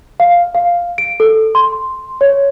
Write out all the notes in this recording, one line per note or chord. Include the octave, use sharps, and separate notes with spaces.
F5
F5
D7
A4
C6
C#5